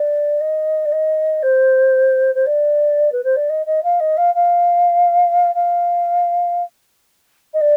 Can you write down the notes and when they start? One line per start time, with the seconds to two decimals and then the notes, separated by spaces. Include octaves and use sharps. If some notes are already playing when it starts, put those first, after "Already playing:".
Already playing: D5
0.40 D#5
0.85 D5
0.92 D#5
1.43 C5
2.35 C5
2.46 D5
3.12 B4
3.24 C5
3.36 D5
3.49 D#5
3.66 D#5
3.83 F5
4.00 D#5
4.17 F5
4.34 F5
5.55 F5
7.54 D#5
7.61 D5